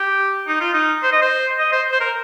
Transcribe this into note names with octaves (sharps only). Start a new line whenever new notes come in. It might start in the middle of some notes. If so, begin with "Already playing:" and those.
Already playing: G4
D#4
F4
D#4
C5
D#5
C5
D#5
C5
C5
A#4